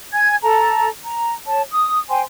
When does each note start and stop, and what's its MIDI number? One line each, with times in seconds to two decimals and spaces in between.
0.13 0.36 80
0.13 0.36 92
0.42 0.88 69
0.42 0.88 81
0.42 0.88 82
1.04 1.34 82
1.46 1.62 73
1.46 1.62 81
1.71 1.99 87
2.09 2.22 72
2.09 2.22 79
2.09 2.22 80
2.09 2.22 84